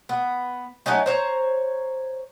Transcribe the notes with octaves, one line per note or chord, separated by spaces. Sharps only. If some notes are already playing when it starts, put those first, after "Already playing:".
B3
F#3 A3 C#4 D#4
C5 C#5 A#5